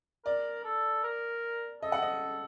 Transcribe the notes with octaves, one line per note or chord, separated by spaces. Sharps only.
A#4 D5
A4
A#4
A4 D#5
F#5
D#5